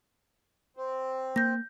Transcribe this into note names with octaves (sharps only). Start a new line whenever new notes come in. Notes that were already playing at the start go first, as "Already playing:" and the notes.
C4
A#3 G6 A#6